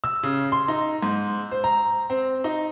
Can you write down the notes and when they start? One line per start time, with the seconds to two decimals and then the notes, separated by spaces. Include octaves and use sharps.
0.04 E6
0.23 C#3
0.52 C6
0.68 D#4
1.03 G#2
1.51 C5
1.64 A#5
2.10 C4
2.44 D#4